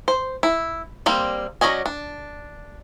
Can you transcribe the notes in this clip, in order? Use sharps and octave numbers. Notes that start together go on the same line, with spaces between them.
C5
E4
G3 A#3 C4
F#3 C#4 D5 D#5 G#5
D4